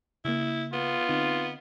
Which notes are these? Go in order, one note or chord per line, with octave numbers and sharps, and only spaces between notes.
C#3 A#3 E4
B3 F4
D3 C4 D#4